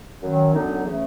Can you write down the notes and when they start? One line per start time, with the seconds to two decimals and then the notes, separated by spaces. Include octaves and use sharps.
0.22 F#2 D#3 F#3
0.53 F#2 D3 F#3 B3 D#4
0.85 C#3 E3 A3